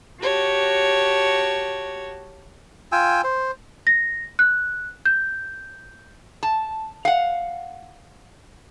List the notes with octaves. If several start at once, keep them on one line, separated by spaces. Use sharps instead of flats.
F#4 G4 C#5 A5
F4 G5 G#5 E6
C5
A#6
F#6
G6
A5
F5 F#5